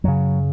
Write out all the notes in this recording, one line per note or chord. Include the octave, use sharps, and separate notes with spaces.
F#2 C#3 F#3